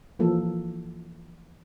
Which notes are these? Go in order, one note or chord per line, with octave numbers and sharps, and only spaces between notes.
E3 F3 A#3 A4